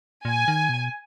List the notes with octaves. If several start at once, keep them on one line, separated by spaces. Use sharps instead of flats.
A#2 G#5
D#3
B2